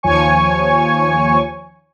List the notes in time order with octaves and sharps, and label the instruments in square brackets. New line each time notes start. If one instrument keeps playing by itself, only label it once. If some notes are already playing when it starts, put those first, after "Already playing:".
[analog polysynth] D#2 F3 C#5 G#5 C#6